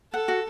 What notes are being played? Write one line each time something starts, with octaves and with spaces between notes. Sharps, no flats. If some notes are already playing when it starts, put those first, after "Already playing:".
A4 F#5
F#4